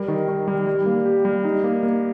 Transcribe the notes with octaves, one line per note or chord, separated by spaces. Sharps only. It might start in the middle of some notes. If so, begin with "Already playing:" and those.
Already playing: G3 A#4
D#3
D#3
G3
G3
A#3
G4
G3
D#4
A#3
A#3